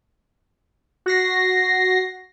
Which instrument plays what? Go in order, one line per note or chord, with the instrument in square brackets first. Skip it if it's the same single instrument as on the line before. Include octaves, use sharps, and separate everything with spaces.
[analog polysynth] F#4 A#6 C7